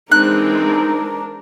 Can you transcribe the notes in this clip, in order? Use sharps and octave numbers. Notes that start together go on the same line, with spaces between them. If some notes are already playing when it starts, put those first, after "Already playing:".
E3 G#3 C4 D4 D#4 A#4 F#6